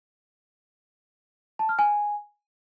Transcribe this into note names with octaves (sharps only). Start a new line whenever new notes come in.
A5
F6
G#5